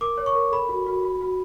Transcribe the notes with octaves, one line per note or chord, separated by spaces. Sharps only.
A#4 D6
C#5
C#6
A#4
A4 B5
F#4
F#4
F#4
F#4